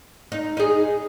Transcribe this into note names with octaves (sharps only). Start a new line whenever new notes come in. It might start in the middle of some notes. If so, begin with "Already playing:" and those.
D#4
D#4 G#4